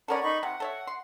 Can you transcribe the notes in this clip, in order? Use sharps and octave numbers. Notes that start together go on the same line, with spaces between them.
C#4 A4 A#4 D5 F#5 B5
D#4 B5 C#6
C3 F#5
A4 C#5 E5
C6